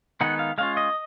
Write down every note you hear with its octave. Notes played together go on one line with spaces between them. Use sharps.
D#3 G#3 B3 D#4 F#5
F5
G#3 C#4 F4 F5
D#5